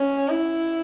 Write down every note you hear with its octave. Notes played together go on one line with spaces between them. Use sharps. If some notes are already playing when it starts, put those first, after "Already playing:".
Already playing: C#4
E4